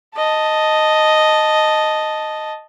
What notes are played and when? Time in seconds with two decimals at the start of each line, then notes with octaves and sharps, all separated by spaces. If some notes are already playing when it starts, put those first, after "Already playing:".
0.17 D#5 A5